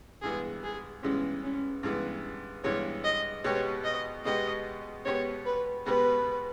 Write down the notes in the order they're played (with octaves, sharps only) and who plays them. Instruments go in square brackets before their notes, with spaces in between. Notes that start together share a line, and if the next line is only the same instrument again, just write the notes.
[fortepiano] G2 E3 G#3 B3 [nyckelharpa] G#4
[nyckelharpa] G#4
[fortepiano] G2 E3 G#3 B3 [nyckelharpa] C#4
[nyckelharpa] C#4
[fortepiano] G2 E3 G#3 B3
[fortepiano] G2 E3 G#3 B3 [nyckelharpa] C#5
[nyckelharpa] D#5
[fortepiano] B2 G#3 B3 G4 [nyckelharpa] C#5
[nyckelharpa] D#5
[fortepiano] B2 G#3 B3 G4 [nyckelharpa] D#5
[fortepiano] B2 G#3 B3 G4 [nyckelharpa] C#5
[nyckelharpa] B4
[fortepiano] B2 G#3 B3 G4 [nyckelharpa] B4